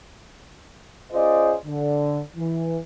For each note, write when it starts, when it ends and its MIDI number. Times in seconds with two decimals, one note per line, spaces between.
1.13 1.54 61
1.13 1.54 65
1.13 1.54 68
1.13 1.54 72
1.13 1.54 74
1.13 1.54 75
1.66 2.19 50
2.36 2.78 52